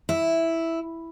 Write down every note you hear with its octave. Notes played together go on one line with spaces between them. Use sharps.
E4